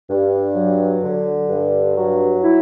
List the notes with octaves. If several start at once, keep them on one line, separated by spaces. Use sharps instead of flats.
G2
F#3
D3
G2
F#3
E4